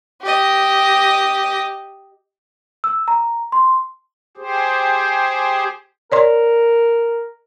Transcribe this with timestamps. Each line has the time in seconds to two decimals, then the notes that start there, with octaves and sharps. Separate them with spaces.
0.22 G4 D#5
2.84 E6
3.08 A#5
3.52 C6
4.37 G4 G#4 C5
6.12 A#4 C#5 D5 C6